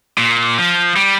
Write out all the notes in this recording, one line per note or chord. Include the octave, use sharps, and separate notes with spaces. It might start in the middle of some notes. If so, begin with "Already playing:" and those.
A#2
F3
G3